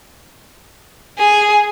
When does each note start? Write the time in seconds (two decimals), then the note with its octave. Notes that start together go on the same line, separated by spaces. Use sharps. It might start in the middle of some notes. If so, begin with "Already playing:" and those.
1.19 G#4